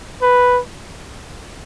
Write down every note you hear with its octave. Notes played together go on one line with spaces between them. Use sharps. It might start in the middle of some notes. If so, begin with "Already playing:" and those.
B4